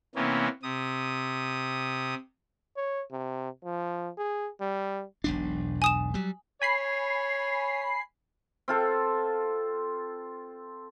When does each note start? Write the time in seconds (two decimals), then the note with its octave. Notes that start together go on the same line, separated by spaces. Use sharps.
0.15 C3 E3 A#3 B3 C#4
0.63 C3 D#6
2.77 C#5
3.12 C3
3.64 F3
4.18 G#4
4.60 G3
5.24 E1 B1 D4
5.82 G#5 D#6 E7
6.14 F#3 G3
6.62 C#5 G#5 B5 C7
8.68 C4 F4 A4